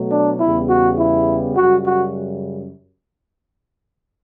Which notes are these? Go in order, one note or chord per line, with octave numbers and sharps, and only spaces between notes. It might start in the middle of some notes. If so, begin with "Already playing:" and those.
Already playing: B2 F#3 A3
D4
E2 C#3 G3 B3 E4
F#4
E4
F#2 C#3 G3 F#4
F#4